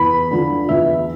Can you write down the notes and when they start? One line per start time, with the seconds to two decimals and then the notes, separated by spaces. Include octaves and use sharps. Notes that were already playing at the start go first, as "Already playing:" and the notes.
Already playing: E2 B5
0.31 D3 F3
0.69 E2 E5